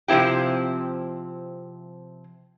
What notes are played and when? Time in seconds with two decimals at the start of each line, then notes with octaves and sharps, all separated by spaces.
0.08 C3 F3 C4 E4 G4